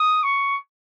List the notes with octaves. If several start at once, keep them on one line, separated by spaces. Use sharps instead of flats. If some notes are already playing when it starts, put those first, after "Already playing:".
Already playing: D#6
C#6